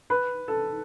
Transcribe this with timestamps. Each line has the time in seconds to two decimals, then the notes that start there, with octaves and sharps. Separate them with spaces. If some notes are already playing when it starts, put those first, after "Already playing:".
0.10 B4
0.48 A4